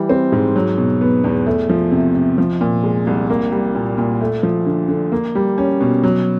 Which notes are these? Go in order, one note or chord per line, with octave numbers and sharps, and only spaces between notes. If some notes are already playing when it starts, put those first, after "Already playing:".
Already playing: E3 G3
C4
G#2
F#3
B2
B3
E2
A3
F3
C3
C3
F3
A#2
G#3
C2
A#3
G3
A#2
A#2
A3
F3
D3
D3
A#3
G3
C#4
B2
F#3